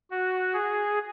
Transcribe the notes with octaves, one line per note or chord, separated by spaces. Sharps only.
F#4
G#4